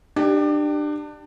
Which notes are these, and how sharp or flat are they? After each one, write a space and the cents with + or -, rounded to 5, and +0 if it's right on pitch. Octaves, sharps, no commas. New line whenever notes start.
D4 +25 G4 +0